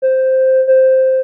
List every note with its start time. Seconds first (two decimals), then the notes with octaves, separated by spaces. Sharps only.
0.02 C5
0.67 C5